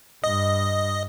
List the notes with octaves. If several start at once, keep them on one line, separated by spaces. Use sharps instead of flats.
G2 D#5